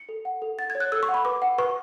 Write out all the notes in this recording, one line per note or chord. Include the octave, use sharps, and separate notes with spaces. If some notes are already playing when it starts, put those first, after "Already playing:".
Already playing: C#7
A4
F#5
A4
F#5 A6
G#6
C#5
F#6
A4 E6
C#6
F#5
B5
B4 D6
F#5
B4 C#6